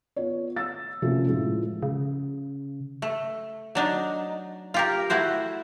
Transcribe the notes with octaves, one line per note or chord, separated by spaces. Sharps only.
B3 F4 C#5
E6 A6
C3 F3 A3 A#3 C4 C#4
A2 F3 G#3
C#3
A3
F#3 D4 D#4
F4 G4 A#4
A3 E4 F#4 C5